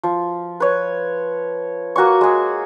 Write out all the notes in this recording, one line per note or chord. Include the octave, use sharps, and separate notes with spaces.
F3
B4 C#5
A#3 F#4 G#5 C#6
G#3 G#4